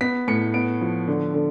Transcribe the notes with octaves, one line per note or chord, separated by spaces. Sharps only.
B3 B6
A2 C#7
B3 D7
F3
D3
D3